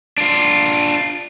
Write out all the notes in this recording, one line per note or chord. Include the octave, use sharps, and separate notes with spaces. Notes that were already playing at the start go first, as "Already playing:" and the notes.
D4 F4